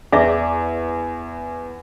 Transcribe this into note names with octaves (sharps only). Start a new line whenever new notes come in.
E2 G#4 D5 E5